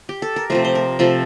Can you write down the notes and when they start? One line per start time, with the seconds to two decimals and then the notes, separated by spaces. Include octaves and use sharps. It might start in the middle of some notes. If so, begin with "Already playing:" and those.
0.09 G4
0.22 A4
0.36 A#4
0.50 C3 F3 A3 C5
0.64 C5
0.75 A#4
0.99 C3 F3 A3 A4